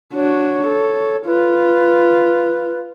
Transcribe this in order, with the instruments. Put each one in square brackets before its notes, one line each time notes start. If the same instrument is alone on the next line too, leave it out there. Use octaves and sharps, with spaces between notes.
[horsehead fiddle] D4 F#4 [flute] C#5
[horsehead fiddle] A4
[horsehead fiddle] F4 [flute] B4